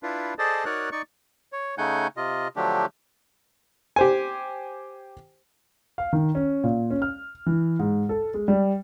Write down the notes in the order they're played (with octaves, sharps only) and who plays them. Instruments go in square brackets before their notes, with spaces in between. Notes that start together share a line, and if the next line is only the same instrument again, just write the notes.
[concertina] D4 E4 F4 B4
G#4 A4 C5 D5 D#5 A5
D#4 F#4 A#4 C#5 D5 F#6
D#4 D5 C#6
[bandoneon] C#5
C#3 A3 D#4 F#5 G#5 G6
C3 F4 D#5
D3 F3 F#3 A3 D4 G4
[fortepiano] G4 C5 G#5
[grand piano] F5
D#3
C#4
A#2
C#4
F6
E3
G#2
A4
G#3
G3